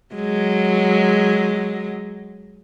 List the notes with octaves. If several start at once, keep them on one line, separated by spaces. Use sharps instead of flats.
F#3 G#3